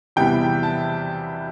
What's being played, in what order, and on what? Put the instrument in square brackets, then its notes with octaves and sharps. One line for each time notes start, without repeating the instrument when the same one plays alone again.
[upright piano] E2 C3 E3 G3 B3 G5
A5